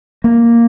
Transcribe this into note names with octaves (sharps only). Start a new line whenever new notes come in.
A#3